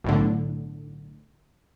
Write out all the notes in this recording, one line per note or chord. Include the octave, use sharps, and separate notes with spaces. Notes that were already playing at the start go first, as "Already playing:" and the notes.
B1 A2 D3